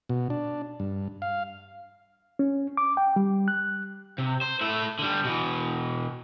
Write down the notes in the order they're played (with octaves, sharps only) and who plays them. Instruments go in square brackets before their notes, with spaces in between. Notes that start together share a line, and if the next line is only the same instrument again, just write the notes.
[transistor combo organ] B2
D4
G2
F5
[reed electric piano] C#4
D6
G5
G3
F#6
[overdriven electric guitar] C3
C5
A3 E4
D3 G3
B2 E3